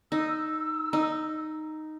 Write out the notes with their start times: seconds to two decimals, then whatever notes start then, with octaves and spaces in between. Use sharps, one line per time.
0.12 D#4 E6
0.93 D#4